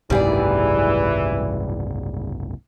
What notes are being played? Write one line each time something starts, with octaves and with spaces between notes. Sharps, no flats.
F#1 C2 G#2 E3 G3 G#4 D5